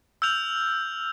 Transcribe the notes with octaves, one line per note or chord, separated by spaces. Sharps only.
E6 F6 G6 F7